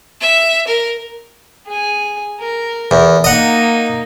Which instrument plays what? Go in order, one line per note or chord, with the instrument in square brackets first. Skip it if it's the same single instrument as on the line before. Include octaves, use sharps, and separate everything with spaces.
[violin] E5
A#4
[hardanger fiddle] G#4 G#5
A#4
[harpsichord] E2
[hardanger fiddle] A#3 D#4 [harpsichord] D#5 F#5